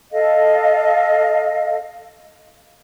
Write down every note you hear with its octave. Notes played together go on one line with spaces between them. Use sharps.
A4 D#5 F5